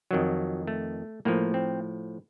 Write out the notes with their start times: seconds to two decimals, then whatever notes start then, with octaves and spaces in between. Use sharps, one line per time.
0.11 F2 D#3 F#3
0.67 A3
1.25 A2 F3 A#3
1.54 C4